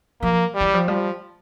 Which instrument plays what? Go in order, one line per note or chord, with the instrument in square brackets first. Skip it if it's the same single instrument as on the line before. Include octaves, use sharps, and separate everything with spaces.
[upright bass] F3 [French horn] A#3
[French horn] G3
[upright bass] E3
F3
[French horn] F3 [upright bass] G3